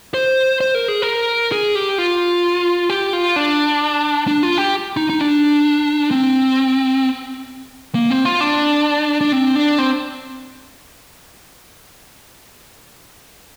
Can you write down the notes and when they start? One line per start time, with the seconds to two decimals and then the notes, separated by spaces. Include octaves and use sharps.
0.14 C5
0.61 C5
0.75 A#4
0.88 G#4
1.02 A#4
1.52 G#4
1.75 G4
1.98 F4
2.90 G4
3.13 F4
3.36 D4
4.27 D4
4.43 F4
4.58 G4
4.97 D#4
5.10 D#4
5.20 D4
6.11 C4
7.95 A#3
8.10 C4
8.25 F4
8.41 D4
9.21 D4
9.32 C4
9.55 D4
9.78 C4